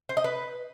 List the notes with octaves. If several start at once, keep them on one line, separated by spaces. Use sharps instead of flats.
C5
D#5
B4